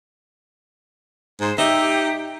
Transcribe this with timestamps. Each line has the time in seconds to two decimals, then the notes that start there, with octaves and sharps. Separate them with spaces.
1.40 G#2 C5
1.58 D#4 G4 E5